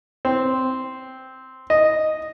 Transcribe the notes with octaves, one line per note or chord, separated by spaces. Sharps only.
C4
D#5